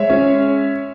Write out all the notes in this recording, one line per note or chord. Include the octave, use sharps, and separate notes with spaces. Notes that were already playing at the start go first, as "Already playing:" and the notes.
Already playing: G#3 C#5 E5
C#4